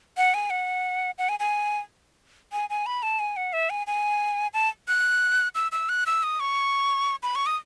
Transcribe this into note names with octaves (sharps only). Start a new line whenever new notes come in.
F#5
G#5
F#5
F#5
G#5
G#5
G#5
G#5
B5
A5
G#5
F#5
E5
G#5
G#5
A5
F#6
E6
E6
F#6
E6
D#6
C#6
B5
C#6
D#6